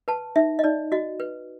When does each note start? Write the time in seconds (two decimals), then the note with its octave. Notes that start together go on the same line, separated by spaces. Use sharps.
0.08 B4 A5
0.36 D#4 E5
0.59 D#5
0.64 D#4 D5
0.92 F#4 D#5
1.20 B4